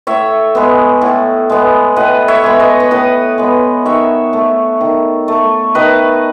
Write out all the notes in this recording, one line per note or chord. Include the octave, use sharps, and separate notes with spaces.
A2 C#5 E5
G#3 B3
A2
G#3 B3
A2 B4 D#5
C#5 E5
G#3 B3
B4 D#5
C#5
A2 B4 D#5
G#3 B3
D#3 C#5 E5
A3
D#3
A3
D#3 B4 D#5